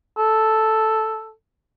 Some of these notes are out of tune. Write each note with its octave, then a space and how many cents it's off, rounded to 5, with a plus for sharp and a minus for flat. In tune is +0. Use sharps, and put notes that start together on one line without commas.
A4 +0